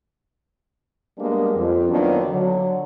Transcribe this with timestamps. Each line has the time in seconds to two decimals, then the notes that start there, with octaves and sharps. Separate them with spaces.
1.18 G3 G#3 A#3 B3 D4
1.55 F2
1.90 D#3 F3 F#3 A#3 B3 D4
2.28 D3 F#3